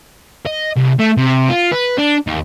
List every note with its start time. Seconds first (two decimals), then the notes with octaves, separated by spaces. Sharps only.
0.46 D#5
0.76 C2
0.99 A3
1.17 C3
1.50 F4
1.72 B4
1.98 D4
2.27 D#2